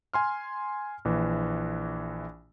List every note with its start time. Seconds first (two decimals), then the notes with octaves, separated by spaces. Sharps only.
0.14 G#5 C6 F6
1.05 A#1 E3